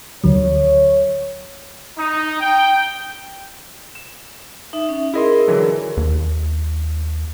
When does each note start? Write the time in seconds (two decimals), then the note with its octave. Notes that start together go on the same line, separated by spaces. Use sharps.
0.24 D2 D3 F#3 C#5
1.99 D#4
2.40 G5
3.95 E7
4.73 D#4 E5
4.89 C#4
5.14 E4 G#4 A#4 D#5 C6
5.48 D3 E3 F#3
5.97 D#2